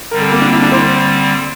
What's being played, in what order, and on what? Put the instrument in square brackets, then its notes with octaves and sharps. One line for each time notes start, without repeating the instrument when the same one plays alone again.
[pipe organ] D3 G3 C4 [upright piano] A#4
[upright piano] A4
A#3
D4
E4
D4
C5